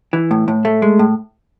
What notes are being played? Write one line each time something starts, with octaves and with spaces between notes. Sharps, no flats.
E3
A2
A2
A3
G#3
A2